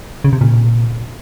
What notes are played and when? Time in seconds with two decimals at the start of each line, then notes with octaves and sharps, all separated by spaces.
0.24 C#3
0.33 C3
0.41 A#2